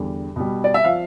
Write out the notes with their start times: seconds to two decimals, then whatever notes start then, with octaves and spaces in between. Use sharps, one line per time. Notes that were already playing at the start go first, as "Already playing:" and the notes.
Already playing: E2 D3 G3
0.36 B2 G3
0.64 D5
0.74 E5
0.84 F3 F5